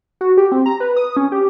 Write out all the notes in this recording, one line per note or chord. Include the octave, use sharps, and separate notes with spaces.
F#4
G4
C4
A#5
B4
D#6
C#4
G4